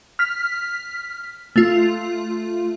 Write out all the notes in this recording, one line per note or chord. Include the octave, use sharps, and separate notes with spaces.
F6 B6
A3 F4